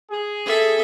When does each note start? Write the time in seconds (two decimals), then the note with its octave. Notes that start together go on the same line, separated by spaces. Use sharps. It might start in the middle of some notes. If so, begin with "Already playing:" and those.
0.11 G#4
0.45 A4 E5